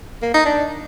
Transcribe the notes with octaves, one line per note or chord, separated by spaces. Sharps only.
A#3
D#4
D4